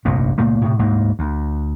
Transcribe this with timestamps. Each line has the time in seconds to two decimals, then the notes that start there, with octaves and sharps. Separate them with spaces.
0.05 F1 A#1 G2 A#2
0.38 C#2 A#2 A3 A#3
0.64 A2 C3
0.79 D2 G#2 A#3
1.19 D2